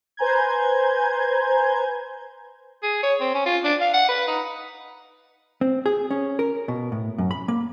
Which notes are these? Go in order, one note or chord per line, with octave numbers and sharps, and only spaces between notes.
B4 C5 G#5 A#5 G6 G#6
G#4
C#5
C4
C#4
F4
D4
F5
F#5
B4
D#4
C4
G#4
C#4
A#4
B2
A2
F#2
B5
A#3